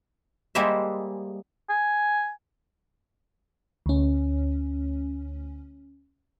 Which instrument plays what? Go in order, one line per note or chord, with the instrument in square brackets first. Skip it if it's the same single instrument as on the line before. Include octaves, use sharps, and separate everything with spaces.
[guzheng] G3 G#3 A#3 C5 D#5 E5
[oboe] G#5
[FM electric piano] D2 C#4